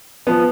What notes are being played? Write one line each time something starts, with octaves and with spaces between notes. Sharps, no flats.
F3 B3